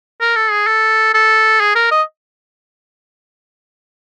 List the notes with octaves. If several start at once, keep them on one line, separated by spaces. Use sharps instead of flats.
A#4
A4
G#4
A4
A4
G#4
A#4
D#5